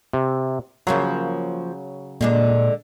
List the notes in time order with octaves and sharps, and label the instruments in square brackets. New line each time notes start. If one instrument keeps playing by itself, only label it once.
[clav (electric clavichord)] C3
[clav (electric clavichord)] C#3 F#3 [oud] F3 A#3 F4
[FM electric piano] A#2 [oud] D3 G#3 D4